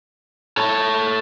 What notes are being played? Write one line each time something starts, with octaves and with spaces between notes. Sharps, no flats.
A4 C#5